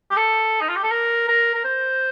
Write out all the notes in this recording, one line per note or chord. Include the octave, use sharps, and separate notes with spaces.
G4
A4
D#4
F4
G4
A4
A#4
A#4
A#4
C5